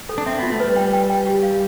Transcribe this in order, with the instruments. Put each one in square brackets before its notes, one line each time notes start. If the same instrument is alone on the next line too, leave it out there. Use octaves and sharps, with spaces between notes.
[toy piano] A4
[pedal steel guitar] D4
[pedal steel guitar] C4 [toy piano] E5
[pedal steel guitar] B3 [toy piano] F4
[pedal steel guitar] A3
[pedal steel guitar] G3 [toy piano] B4
[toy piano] G5
G5
G5
G4
F5